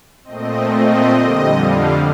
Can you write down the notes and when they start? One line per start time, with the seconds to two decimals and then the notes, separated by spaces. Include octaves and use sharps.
0.24 A#2 A3 C4 D#5
0.68 D#5
1.10 F2 D3 G3 D#5
1.54 F5